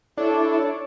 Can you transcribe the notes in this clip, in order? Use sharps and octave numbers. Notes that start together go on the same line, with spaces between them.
D4 E4 A4 C#5